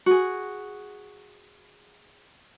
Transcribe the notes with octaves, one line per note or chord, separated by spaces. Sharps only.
F#4 G#4